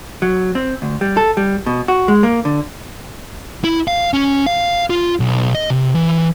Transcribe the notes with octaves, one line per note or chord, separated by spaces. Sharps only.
F#3
C4
D2
G3
A4
G3
B2
F#4
G#3
A#3
D3
E4
F5
C#4
F5
F4
B1
D#5
C3
E3